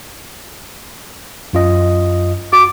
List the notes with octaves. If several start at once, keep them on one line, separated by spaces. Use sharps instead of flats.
F#2 F4 D#5
F#4 D6